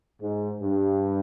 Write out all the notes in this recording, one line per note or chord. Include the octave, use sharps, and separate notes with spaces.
G#2
G2